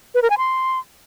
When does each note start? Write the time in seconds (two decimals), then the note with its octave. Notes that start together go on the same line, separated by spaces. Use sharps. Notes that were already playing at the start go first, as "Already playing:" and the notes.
0.15 B4
0.22 A#4
0.30 G#5
0.38 C6